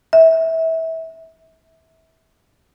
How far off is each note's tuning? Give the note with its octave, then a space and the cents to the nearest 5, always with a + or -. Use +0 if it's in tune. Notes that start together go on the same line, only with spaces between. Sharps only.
E5 -25